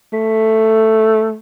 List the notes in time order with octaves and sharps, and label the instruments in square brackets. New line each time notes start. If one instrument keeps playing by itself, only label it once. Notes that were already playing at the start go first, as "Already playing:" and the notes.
[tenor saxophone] A3